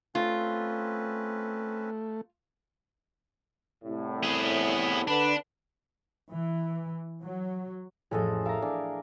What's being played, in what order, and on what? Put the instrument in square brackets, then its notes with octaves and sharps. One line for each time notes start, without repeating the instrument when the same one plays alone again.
[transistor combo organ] A3 [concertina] C4 C#4 B4 [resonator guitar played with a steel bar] F4
[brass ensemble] C2 A2
[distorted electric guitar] B3 G#4
[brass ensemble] D3 B4 [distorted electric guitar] D4
[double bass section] E3
F#3
[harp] A1 F2 [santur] G#4 A4 D#5
[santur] A4 A#4 F5 [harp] E5 A#5
[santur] D4 G#4